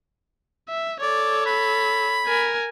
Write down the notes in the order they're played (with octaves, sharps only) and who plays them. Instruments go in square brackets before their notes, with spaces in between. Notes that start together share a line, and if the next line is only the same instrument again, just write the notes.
[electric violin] E5
[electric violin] A4 C#5 [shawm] D5
[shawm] B5
[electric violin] A#4 G#5